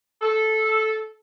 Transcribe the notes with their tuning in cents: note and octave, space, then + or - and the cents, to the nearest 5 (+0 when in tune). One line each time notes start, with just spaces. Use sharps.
A4 -10